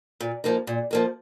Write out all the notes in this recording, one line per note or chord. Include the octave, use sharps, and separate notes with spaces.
A#2
F3 A#3 D#4
A#2
F3 A#3 D#4